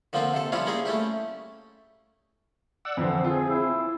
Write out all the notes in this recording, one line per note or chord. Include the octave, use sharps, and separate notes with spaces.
D3 F3 A#3 C4 F4
C3 A4
F3 G3 C#4 E4 F4 C#5
G3 A#3 C#4 G#4 A#4
A3 C#4 E4 G4
D5 F#5 E6
F2 D3 E3 C4
F4 G#4
E4